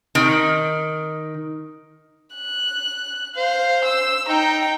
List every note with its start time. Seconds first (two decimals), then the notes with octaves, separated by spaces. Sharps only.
0.15 D#3
2.36 F#6
3.37 C5 F5
3.85 E6
4.28 D#4 G5 A#5